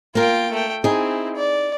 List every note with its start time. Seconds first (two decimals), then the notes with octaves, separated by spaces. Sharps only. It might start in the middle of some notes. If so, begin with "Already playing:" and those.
0.15 A#3 F4 A#4 G5
0.52 A3 G5
0.84 C4 D#4 E4 G#4
1.36 D5